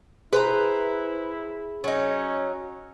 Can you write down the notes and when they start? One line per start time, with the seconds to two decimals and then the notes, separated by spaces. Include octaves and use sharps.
0.33 E4 G#4 B4 C5 A#5
1.84 F#3 C#4 D#4